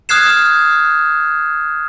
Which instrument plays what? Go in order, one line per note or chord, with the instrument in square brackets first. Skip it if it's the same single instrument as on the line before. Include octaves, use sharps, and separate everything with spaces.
[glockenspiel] D#6 F6 F#6 G#6 C7 E7